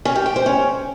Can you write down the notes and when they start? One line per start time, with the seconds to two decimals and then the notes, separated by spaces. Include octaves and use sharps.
0.05 C#4
0.16 G4
0.26 G5
0.36 C5
0.46 C#4